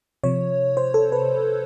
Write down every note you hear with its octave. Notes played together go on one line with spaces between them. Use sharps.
C3 F3 C#5
C5
A4
B4